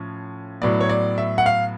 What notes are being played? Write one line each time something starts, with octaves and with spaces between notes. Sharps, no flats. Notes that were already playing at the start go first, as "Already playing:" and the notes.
Already playing: A2 F3 C#4
A2 F#3 B3 D5
C#5
D5
E5
F#5
F5